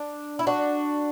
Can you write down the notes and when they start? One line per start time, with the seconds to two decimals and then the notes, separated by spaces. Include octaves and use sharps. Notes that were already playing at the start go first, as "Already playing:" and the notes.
Already playing: D4
0.39 E4
0.47 D4 F#4